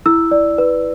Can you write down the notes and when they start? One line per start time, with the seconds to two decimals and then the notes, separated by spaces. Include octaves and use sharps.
0.06 E4 E6
0.31 D5
0.58 B4